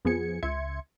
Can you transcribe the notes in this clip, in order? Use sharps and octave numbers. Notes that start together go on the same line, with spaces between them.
F2 F3 B3 G#4 G#6 C#7
C#2 E5 C6 G#6 C#7